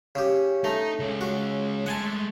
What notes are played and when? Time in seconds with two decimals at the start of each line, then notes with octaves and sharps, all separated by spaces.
0.15 C#3 C#4 G4
0.64 A3 D#4
1.00 C#2 C#3
1.21 F#4
1.86 G#3 A3 F#5 G#5 A5